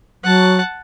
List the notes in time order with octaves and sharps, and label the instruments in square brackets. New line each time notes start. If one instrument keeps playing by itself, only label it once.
[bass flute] F#3 [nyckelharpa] F#5 A5